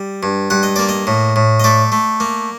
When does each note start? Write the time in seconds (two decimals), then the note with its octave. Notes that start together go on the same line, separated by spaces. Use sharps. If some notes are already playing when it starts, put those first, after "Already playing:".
Already playing: G3
0.23 G2
0.50 G2 F#5
0.63 D#5
0.76 A#3 D5
0.89 D#5
1.07 A2
1.36 A2
1.60 D#5
1.64 A3 D5
1.92 A3
2.20 A#3